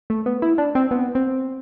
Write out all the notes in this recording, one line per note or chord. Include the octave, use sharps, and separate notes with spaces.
A3
B3
E4
D4
C4
B3
C4